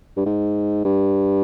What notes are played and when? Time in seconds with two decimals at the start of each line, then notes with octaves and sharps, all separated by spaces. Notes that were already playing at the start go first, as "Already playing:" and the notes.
0.17 G2
0.26 G#2
0.85 G2